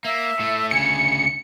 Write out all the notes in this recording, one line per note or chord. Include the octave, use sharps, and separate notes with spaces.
A#3 E5
A2 A3
D2 C#3 G#5 C#7